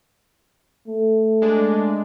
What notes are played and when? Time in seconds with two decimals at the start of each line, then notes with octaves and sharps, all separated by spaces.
0.87 A3
1.42 G#3 D4